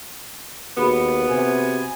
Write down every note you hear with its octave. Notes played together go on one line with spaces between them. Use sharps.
D#2 B3 F#4 G#4 B5
C3 G#5